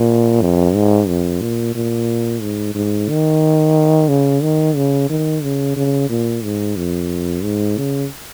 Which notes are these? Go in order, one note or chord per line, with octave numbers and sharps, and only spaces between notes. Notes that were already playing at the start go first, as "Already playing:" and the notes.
Already playing: A#2
F2
G#2
F2
A#2
A#2
G#2
G#2
D#3
C#3
D#3
C#3
D#3
C#3
C#3
A#2
G#2
F2
G#2
C#3